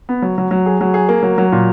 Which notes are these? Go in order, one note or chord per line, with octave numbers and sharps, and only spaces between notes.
B3
F#3
F#3
F#3
G#4
F#3
G#4
A#3
F#3
F#3
A#2